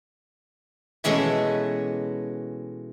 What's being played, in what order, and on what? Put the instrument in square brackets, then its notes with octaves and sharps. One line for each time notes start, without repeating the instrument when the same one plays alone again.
[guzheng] B2 E3 G#3 A3 C#4